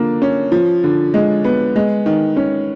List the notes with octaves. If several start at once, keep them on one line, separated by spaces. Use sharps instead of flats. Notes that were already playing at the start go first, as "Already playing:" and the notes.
Already playing: D3 F3 A#3
C#4
F3
D3
G#3
B3
G#3
D#3
C#4